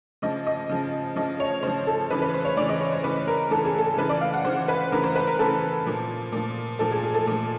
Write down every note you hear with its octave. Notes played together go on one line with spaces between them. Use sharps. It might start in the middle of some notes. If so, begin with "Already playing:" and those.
C#3 F3 D#5
D#5
C#3 F3
C#3 F3 D#5
C#5
C#3 F3 C5
A4
C#3 E3 B4
B4
C5
C#5
C#3 E3 D5
D#5
C#5
C5
C#3 E3 B4
A#4
C#3 E3 A4
G#4
A4
C#3 E3 B4
D5
F5
F#5
C#3 E3 C5
B4
C#3 E3 A#4
C5
B4
A#4
C#3 E3 A4
A#2 F3
A#2 F3
A#2 F3 A4
G#4
G#4
A4
A#2 F3